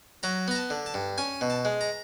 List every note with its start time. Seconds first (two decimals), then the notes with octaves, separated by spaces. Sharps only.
0.23 F#3 A#5
0.48 B3 A#5
0.55 A5
0.70 D3
0.86 A5
0.94 G2
1.18 C#4 G#5
1.41 B2
1.50 A5
1.65 G#3
1.81 A#5